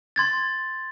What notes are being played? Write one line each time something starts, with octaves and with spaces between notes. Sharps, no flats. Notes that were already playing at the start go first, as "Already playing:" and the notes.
C6 G#6 A6